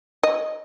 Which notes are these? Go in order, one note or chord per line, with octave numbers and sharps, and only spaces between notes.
D#5